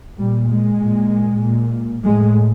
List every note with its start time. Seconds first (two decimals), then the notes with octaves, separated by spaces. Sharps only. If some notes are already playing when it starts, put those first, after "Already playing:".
0.19 A#2 G3
0.50 G#3
0.80 A#2
1.42 A#2
2.03 A2 G#3